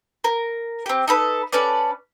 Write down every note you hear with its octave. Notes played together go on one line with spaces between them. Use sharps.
A#4
C4 G4
D#4 A4 B4
C#4 A4 B4 D5